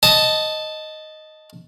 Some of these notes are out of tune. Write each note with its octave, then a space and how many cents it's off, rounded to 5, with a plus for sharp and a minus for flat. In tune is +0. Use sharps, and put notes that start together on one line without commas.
D#5 +0 A5 +0